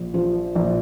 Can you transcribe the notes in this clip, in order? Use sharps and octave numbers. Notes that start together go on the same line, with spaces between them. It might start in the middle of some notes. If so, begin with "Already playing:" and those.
Already playing: A#1
F3
A#1